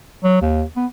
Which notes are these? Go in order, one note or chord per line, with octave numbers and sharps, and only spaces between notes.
F#3
D#2
B3